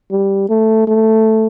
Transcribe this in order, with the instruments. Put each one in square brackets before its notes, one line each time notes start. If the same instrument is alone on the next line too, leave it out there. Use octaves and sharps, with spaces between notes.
[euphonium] G3
A3
A3